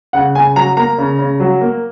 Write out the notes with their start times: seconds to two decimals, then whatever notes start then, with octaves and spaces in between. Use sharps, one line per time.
0.13 C#3 F#5
0.35 C#3 G#5
0.56 F#3 A#5
0.77 A#3 A#5
0.98 C#3
1.19 C#3
1.40 F#3
1.61 A#3